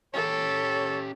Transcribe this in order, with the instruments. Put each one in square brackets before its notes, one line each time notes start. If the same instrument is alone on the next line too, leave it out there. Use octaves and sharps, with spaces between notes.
[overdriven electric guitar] C#4 G4 [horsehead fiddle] A4 [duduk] C#5